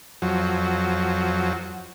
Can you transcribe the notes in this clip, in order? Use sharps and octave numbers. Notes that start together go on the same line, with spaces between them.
F2 F#3